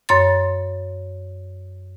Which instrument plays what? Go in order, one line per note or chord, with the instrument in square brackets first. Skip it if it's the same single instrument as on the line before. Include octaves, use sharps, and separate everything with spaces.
[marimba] F#2 C#5 C6 A6